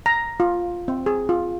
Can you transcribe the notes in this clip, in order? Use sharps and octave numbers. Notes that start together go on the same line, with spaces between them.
A#5
F4
C4
G#4
F4